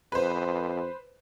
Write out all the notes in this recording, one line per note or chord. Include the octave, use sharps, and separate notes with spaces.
F2 B4 C5